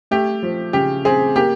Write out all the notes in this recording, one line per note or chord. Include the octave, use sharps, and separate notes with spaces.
A3 G4
F3
C#3 G4
C4 G#4
A#3 G4